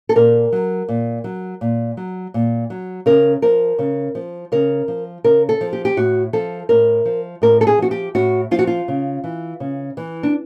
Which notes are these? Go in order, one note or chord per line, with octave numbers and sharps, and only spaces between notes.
A4
A#2 A#4
F#3
A#2
F#3
A#2
F#3
A#2
F#3
C#3 A#4
F3 A#4
C#3
F3
C#3 A#4
F3
C#3 A#4
A4
F3
G4
G4
A2 F#4
F3 A4
A2 A#4
F3
A2 A#4
A4
G#4
F3 F#4
G4
A2 F#4
F3 F4
F#4
F4
C#3
E3
C#3
E3
D4